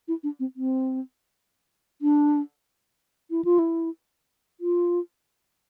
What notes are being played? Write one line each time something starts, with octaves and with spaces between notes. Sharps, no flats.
E4
D4
C4
C4
D4
E4
F4
E4
F4